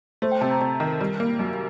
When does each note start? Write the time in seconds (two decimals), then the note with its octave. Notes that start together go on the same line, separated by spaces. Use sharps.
0.22 A3 C5
0.32 G5
0.41 C3 A5
0.51 A#5
0.61 C3 A5
0.80 D#3
0.87 A#4
1.00 G3
1.20 A#3
1.39 F#2